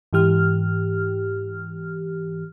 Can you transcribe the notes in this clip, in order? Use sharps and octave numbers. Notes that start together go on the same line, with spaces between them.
G#2 E3 G4 F6